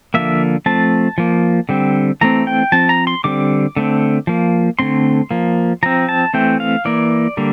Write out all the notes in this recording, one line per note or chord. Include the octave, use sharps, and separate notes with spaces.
D3 F3 A#3 E5
F3 A3 C4 A5
F3 A#3
D3 G3 C4
E3 A3 C4 A#5
G5
F3 C4 A5
A#5
C6
D3 G3 C4 D6
D3 A3 C4
F3 A#3
D3 A3 C4 C6
F3 A#3
F3 C4 A#5
A5
E3 A3 C4 G5
F5
E3 A#3 D5
D3 G3 A#3